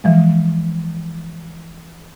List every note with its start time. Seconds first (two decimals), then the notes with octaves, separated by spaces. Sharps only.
0.04 E3 F3 G#3